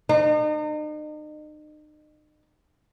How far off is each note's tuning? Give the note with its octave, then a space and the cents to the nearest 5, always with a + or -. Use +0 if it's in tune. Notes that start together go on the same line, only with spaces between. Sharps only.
D#4 -40